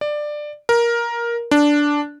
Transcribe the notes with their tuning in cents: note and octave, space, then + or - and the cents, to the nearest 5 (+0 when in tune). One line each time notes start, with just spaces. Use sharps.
D5 +15
A#4 +10
D4 -5